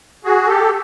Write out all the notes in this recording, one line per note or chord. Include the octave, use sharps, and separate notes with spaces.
F#4 G#4
G4 A4